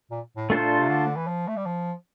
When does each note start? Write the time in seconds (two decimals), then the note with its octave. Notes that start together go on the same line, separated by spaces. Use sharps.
0.11 A#2
0.37 A2
0.50 A#2 A3 D4 F4 A4 C5
0.79 C3
0.89 D3
1.17 E3
1.27 F3
1.48 A3
1.57 G3
1.66 F3